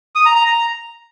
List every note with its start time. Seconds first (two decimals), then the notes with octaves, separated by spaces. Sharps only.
0.15 D#6
0.26 A#5
0.36 A#5
0.46 A#5